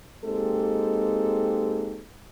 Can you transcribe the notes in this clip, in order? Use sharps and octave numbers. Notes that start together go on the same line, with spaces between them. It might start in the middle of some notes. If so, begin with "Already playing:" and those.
G#3 A#3 C4 D#4 G4 A4